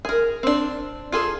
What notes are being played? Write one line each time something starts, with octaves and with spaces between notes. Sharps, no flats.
G#4 A#4
C4 D4
F4 G#4 A4